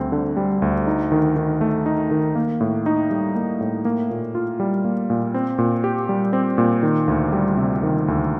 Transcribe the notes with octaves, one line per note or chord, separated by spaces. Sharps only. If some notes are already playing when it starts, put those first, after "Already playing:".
Already playing: D2 G3 C4
D3
G3
D2
D#4
D#3
D#3
A3
D#4
D#3
A#3
A2
D#4
G3
A#3
A2
A#3
A#2
F4
G3
A#3
A#2
C4
A#2
G4
G3
C4
A#2
D#3
D2
G3
C3
D#3
D2